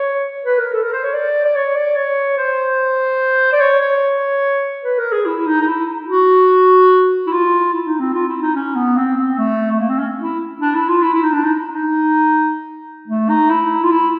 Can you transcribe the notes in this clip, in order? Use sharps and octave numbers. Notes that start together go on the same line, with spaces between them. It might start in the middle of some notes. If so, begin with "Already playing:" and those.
Already playing: C#5
B4
A#4
A4
A#4
C5
C#5
D5
D5
C#5
D5
C#5
C5
D5
C#5
C#5
B4
A#4
G#4
E4
D#4
D#4
E4
F#4
E4
F4
E4
D#4
C4
F4
E4
D#4
C#4
B3
C4
C4
A3
A3
A#3
C4
C#4
E4
D4
E4
F4
E4
E4
D#4
D4
D#4
D#4
A3
D#4
E4
F4
E4